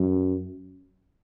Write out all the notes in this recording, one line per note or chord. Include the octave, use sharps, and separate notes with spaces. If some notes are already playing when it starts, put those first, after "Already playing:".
Already playing: F#2